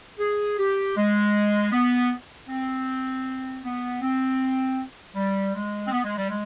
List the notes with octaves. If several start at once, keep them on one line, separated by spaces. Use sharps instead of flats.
G#4
G4
G#3
B3
C4
B3
C4
G3
G#3
C4
B3
G#3
G3
G#3